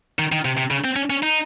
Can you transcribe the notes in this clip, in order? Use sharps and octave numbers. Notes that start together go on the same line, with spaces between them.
D#3
D#3
C3
C3
C#3
C4
C#4
C#4
D#4